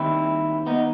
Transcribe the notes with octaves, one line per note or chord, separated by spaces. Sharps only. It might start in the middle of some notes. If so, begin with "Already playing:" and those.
Already playing: D#2 D#3 G3 C4 E4
B3 D#4